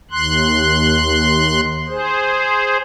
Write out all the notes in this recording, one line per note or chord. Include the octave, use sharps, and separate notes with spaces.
D#2 C6 F#6
G#4 C5